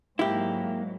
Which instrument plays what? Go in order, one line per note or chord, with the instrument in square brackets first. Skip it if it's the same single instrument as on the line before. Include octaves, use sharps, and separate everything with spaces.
[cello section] G#2 F#3 [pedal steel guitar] A#3 [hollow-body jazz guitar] E4 G4